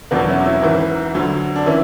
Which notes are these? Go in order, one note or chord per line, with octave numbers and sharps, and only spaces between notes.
E2 B2 F#3 B3 D4
C#4 E4
C#4 E4
G#2 E3
D2 D3 F#3
D4
E3 C#4 E4